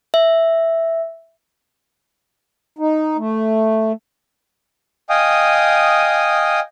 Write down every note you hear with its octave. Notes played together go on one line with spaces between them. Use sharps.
E5
D#4
A3
D#5 F5 G5 G#5 D#6